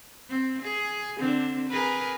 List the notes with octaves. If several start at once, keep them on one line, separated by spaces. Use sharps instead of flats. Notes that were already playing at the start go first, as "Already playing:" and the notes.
C4
G#4
D3 C4 D4
G#4 A#4 B4